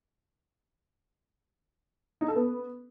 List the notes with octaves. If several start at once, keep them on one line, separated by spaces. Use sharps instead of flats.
D#4
A4
B3